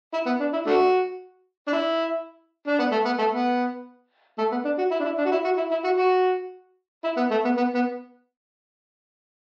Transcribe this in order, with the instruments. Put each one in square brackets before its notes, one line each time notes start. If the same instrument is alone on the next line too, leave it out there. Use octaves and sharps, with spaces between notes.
[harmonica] E4
B3
D4
E4
A3 D4 F#4
D4
E4
D4
B3
A3
B3
A3
B3
A3
B3
D4
F#4
E4
D4
E4
D4
F#4
E4
F#4
E4
E4
F#4
F#4
E4
B3
A3
B3
B3
B3